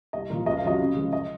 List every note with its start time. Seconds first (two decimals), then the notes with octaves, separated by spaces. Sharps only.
0.13 C2 D#5
0.30 A#2 F3 A#3 F4 A#4
0.46 C#2 D#5
0.57 F5
0.63 C3 F#3 C#4 F4 D#5
0.80 C#3
0.96 F3 G#3
1.13 D#5